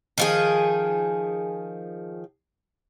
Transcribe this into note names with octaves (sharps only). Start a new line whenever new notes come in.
D#3 F3 G#4